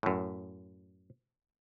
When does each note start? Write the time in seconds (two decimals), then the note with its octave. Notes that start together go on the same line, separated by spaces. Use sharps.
0.03 F#2 A2